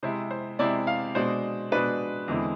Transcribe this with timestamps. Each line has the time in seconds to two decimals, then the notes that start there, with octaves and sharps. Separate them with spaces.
0.03 C3 G#3 C4 E4 C5
0.31 C5
0.59 C3 G#3 C4 E4 D5
0.87 F5
1.15 B2 G#3 D4 C5
1.72 B2 G#3 D4 B4
2.28 E2 D3 G#3 C4 E4